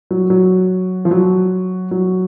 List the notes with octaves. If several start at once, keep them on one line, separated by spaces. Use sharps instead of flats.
F#3
F#3
F3
F#3
F#3